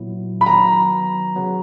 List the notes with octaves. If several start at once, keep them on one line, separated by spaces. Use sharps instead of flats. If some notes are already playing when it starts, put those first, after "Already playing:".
Already playing: A#2 F#3 B3 E4
B5
D#3 F#3 B3 A#5
C#3 F#3 B3